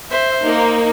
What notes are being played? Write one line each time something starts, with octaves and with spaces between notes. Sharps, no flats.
C5 E5
A#3 D#4